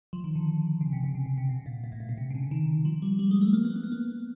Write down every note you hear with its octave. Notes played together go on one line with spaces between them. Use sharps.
F3
D#3
D3
C#3
C3
C3
C#3
C#3
C3
B2
A#2
A#2
A2
A#2
B2
C3
C#3
D3
D#3
F3
G3
G3
G#3
A3
A#3
B3
A#3
B3
A#3